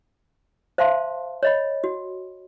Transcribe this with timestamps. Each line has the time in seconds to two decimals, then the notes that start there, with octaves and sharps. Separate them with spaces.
0.78 C5 E5 F5 A5 C6
1.43 C#5 D#5 B5
1.84 F#4